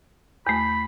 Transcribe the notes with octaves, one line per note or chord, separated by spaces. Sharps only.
E2 A3 B5